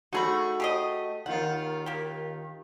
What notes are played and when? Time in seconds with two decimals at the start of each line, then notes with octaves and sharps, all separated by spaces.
0.13 A3 D#4 F#4 G#4 B5
0.60 G4 G#4 D#5
1.26 D#2 D#3 F4 F#5
1.86 A#3 G4